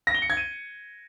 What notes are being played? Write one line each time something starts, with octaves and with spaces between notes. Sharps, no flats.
A#6
G7
C#7
G#6
D#7